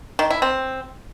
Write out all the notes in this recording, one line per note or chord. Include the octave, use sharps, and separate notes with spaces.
D#3
E4
C4